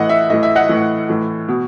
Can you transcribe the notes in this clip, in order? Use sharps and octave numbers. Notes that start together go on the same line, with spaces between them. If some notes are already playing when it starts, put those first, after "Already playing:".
Already playing: A2 E3 D#5 F#5
E5
A2 E3 D#5
E5
D#5 F#5
A2 E3
A2 E3
B2